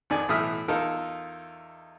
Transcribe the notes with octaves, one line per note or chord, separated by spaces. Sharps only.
G#1 F2 D#3 D5 G#5
B1 A2 E3 E5 D#6 F6
E2 D#4 F4 A4 A#4